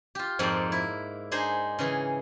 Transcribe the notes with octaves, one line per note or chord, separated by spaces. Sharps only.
F4 G4
F2 G#2 F3 A#3 A4 D5
E4
D4 D#4 G#4 C5
C#3 E3 G#4